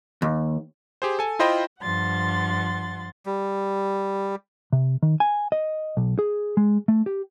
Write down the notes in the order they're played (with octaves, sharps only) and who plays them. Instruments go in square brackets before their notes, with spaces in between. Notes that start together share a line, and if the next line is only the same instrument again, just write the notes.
[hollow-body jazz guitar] D#2
[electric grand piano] G4 G#4 C5
A4 G#5
E4 F4 C5 D#5 G5 B5
[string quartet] G2 F3 F#5 C6 A6
[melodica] G3
[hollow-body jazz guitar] C3
D#3
G#5
D#5
B1
G#4
G#3
A3
G4